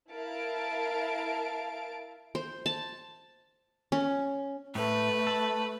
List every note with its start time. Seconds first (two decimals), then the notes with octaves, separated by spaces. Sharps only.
0.10 E4 A#4 F5 A5 D7
2.35 C5
2.66 A5
3.92 C#4
4.75 A2 A3 B4
5.27 A4